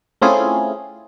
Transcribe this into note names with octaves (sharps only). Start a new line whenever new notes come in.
A3 C4 C#4 E4 F4 G#4